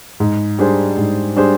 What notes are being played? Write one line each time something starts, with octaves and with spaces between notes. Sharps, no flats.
G#2
G3 D4 G#4 C5
G#2
G3 D4 G#4 C5